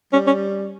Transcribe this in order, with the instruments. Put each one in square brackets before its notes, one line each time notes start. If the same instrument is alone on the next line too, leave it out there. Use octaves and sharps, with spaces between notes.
[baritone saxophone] G3 [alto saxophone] C#4
[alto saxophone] C#4